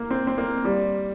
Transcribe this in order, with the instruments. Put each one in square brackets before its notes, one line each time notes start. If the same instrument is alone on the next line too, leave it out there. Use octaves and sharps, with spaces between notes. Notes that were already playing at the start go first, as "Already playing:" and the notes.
Already playing: [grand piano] A#3
C4
C4
A#3
G3